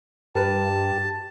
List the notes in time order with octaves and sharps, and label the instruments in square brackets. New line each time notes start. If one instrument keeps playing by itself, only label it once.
[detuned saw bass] G2 [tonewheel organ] G4 [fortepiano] A#4 B4 [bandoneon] A5